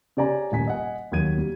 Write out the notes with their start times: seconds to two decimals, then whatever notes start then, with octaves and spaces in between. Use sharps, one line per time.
0.17 C#3 G4 D5 G#5 A#5
0.52 D#1 G#5 B6
0.67 D#5 F#5 G#5
1.12 D#2 F#3 G#6 D#7
1.38 G3